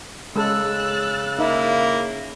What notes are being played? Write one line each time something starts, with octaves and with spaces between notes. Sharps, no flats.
C#3 G#3 A4 E6 F#6 A6
A#3 D#4 E4